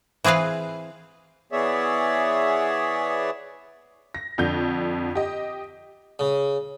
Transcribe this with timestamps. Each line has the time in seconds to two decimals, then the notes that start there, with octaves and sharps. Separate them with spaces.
0.24 E3 C4 G#4 B4 F5
1.52 E3 B3 G#4 C#5 D5 E5
4.14 A#6
4.38 F2 D3 G6
5.15 G4 D#5
6.19 C#3